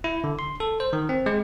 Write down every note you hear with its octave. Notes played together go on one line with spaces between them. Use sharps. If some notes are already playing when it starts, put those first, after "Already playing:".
E4
D3
C6
A4
C5
D#3
C4
G#3